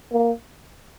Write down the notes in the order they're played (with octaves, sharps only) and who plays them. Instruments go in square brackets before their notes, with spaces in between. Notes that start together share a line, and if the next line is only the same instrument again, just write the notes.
[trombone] A#3